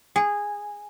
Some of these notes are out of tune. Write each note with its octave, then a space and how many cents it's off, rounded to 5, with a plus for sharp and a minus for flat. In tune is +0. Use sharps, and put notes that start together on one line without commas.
G#4 -15